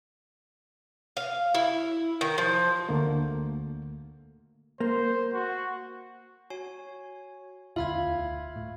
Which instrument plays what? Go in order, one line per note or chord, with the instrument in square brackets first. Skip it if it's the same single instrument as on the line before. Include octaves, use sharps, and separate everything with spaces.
[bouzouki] F5
E4
D#3
F3
[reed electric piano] D2 D3 A3 A#3
[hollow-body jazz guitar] A#3 [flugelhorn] C5
[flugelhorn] F#4
[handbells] F#4 C#5 G#5
[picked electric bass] E1 D2 [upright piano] F4 [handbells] E5 B5 G#6
[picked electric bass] A2